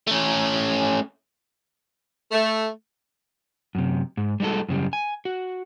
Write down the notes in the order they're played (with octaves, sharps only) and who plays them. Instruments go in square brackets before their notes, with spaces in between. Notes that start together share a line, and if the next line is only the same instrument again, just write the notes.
[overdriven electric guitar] A3 C#4
[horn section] A3
[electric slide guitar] F#2 C3
G#2
G3 G#3 D#4 F#4 A4
F#2 C#3 G3
G#5
F#4